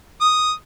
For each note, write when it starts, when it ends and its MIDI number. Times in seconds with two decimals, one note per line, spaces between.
0.21 0.52 87